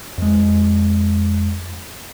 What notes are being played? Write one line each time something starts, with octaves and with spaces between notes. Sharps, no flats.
F2 G#3